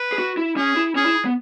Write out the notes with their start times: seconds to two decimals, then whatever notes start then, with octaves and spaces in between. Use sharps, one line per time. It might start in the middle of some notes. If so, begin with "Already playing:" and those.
Already playing: B4
0.12 G#4
0.19 F#4
0.37 E4
0.57 C#4 G#4
0.77 E4
0.95 C#4 G#4
1.06 E4
1.25 B3